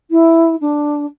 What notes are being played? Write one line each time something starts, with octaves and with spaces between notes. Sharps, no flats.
E4
D4